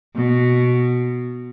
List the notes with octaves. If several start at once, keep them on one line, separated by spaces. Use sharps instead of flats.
B2